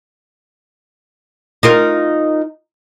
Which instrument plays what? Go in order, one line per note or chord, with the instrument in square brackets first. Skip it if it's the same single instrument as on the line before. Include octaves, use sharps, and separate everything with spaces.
[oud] D#4 F4 A#4